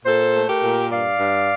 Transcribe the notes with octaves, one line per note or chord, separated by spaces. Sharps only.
A#2 A4 C5
A3
G4 A#4
A#2
G2 D5 F5
G2